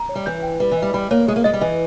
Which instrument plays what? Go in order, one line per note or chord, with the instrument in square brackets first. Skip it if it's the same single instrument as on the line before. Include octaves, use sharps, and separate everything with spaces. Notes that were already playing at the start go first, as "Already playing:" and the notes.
Already playing: [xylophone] A#5
C#5
[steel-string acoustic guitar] G3
[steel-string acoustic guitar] E3 [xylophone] G6
[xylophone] G5
[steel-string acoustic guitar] G3 [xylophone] B4
[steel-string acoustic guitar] E3
[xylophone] D#5
[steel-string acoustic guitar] G3
[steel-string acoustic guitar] G3 [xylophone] B5
[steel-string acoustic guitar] A#3 [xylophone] C#5
[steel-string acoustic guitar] G#3 [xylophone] G#4
[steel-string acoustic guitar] A#3
[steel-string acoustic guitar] G#3 [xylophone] D#5
[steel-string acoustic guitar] G3
[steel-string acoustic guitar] E3 [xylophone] D#5